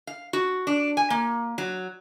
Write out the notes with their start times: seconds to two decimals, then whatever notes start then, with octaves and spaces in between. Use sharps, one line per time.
0.07 F5
0.33 F#4
0.67 D4
0.97 G#5
1.10 A#3
1.58 F#3